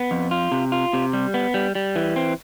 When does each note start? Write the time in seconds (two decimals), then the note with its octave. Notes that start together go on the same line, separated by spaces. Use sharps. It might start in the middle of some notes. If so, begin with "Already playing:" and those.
Already playing: B3
0.11 F2
0.31 F4
0.52 C3
0.72 F4
0.93 C3
1.13 G3
1.34 B3
1.54 G3
1.75 G3
1.96 E3
2.16 C4